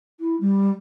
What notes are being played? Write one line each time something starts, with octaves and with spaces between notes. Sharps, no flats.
E4
G3